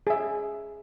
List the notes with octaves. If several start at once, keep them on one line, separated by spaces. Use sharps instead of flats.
G#4 E5